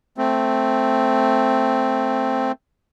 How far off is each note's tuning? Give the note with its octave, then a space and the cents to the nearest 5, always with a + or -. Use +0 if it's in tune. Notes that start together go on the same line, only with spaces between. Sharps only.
A3 +0 C4 +0